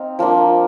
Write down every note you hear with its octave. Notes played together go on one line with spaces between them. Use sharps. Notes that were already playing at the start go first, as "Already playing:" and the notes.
Already playing: C4 D#4 F5
F3 A#3 D4